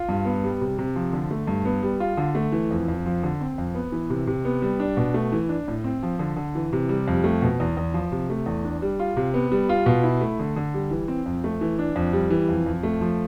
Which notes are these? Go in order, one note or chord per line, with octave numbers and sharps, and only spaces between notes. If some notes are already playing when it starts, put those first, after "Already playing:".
Already playing: F4
G2
B3
G3
C3
C3
F3
D3
A3
G2
B3
G3
F4
D3
A3
E3
F2
F2
F3
D3
C4
F2
B3
E3
C3
C3
B3
G3
D4
B2
A3
E3
D4
A2
C4
F3
D3
D3
E3
C3
G3
F2
A3
B2
E2
E2
F3
C3
A3
E2
D4
G3
F4
C3
B3
G3
F4
B2
E4
A3
D3
D3
G3
E3
C4
F2
A3
E3
D4
F2
G3
E3
F2
F2
A3
F3